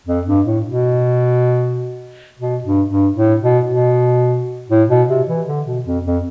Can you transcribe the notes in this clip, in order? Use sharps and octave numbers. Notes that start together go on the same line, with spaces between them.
F2
G2
A2
B2
B2
G2
G2
A2
B2
B2
A2
B2
C3
E3
D3
B2
F2
F2